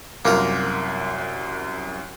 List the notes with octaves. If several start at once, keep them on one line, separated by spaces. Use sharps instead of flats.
C2 F#2 A#3 F4 A#4